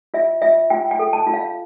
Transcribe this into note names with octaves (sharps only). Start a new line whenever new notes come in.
F4 E5
F4 E5
F4 G5
G5
A4
A5
F4
F5